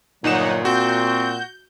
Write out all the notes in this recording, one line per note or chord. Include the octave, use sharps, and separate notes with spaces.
G1 A#2 F#3 D#4 F#5 E7
C4 F#4 G6